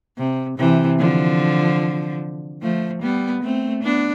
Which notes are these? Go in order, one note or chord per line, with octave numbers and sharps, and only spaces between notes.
C3
C3 E3
D3 F3
F3 A3
G3 B3
A3 C4
B3 D4